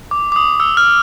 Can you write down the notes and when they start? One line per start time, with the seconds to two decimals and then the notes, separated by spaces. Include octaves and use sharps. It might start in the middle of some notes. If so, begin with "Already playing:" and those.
0.11 D6
0.32 D6
0.36 D#6
0.60 E6
0.77 F6